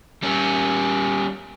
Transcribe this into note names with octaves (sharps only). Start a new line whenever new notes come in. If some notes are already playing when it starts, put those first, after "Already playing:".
G3 C#4